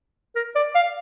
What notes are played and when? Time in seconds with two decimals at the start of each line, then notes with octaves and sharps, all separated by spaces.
0.36 A#4
0.56 D5
0.75 F5